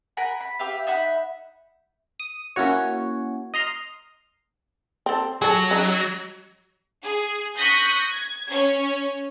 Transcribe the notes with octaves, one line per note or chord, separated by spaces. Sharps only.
A#4 F#5 G#5 B5
B5
G4 B4 E5 F5
D#4 E5 F#5 B5
D#6
A#3 C#4 E4 F#4 C#5
D#5 A#5 C6 F6
C4 A4
F#3 G#4 A4
C#3 D#4
G#4
C#6 D#6 F#6 G6 A#6 B6
G#6
C#4 C#5